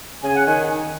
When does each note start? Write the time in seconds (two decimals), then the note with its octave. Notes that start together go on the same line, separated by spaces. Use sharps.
0.24 C#3 G#5
0.35 F#5
0.46 D#3 G#5